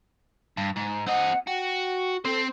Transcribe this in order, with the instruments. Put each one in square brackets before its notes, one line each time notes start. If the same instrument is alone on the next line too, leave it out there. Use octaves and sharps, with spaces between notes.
[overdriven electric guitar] G2
G#2
[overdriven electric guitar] C4 D#5 [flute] F#5
[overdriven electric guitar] F#4 [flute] G5
[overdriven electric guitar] C4 C5 [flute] A4